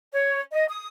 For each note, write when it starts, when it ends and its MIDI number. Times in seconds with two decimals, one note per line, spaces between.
0.13 0.41 73
0.52 0.65 75
0.69 0.88 87